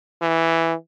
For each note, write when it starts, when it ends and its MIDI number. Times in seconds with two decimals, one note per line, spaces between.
0.22 0.74 52